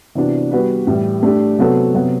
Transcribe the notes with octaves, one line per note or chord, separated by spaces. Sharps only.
C3 E3 B3 D4 F#4
G3 B3 F#4 B4
A2 E3 G3
A3 D4 G4
C3 F#3 B3 F#4 A4
C3 F#3 B3 F#4